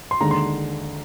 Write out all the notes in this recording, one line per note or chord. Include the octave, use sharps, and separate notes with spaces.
C6
D#2 D3 G#3 A#5
C6